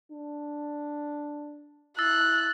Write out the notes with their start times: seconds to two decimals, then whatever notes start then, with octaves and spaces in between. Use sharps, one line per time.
0.12 D4
1.99 E4 E6 F#6 A6